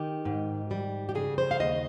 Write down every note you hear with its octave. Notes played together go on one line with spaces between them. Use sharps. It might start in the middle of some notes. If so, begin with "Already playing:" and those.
Already playing: D#3 G4
G#2
G3
G4
C#3 G#4
C5
F5
D#2 D#5